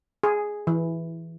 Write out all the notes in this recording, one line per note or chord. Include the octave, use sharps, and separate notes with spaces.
G#4
E3